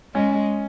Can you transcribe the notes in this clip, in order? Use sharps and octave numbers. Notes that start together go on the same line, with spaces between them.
G#3 C#4